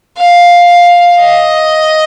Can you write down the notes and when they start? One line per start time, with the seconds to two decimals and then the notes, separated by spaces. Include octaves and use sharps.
0.17 F5
1.20 D#5